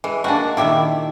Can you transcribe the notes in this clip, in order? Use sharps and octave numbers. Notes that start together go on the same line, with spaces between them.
E3 G#3
D#3 G#3 A#3 D4 F#4
A#2 D#3 E4 G4 E5